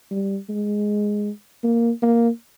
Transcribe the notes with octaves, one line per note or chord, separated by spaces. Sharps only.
G3
G#3
A#3
A#3